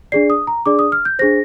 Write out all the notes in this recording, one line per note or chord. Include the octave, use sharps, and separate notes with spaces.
D4 G#4 D5 C7
D#6
A#5
D4 G#4 D5 D6
D#6
F6
G6
D4 G#4 C5 A#6